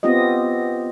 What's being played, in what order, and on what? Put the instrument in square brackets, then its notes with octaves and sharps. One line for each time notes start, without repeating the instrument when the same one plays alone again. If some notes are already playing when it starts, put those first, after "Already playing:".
[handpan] B3 C4 F4 G4 D#5